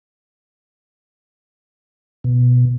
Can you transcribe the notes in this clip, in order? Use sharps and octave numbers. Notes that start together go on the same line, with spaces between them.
B2